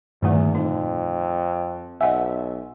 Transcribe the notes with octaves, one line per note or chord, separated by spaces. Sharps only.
E2 G2 A#2 D3 D#3 A3
F2 D#4
B1 D#5 E5 F#5 G#5